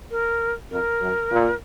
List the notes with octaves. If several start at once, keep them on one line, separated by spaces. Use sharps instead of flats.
A#4
F2 A#4
F#2
A#2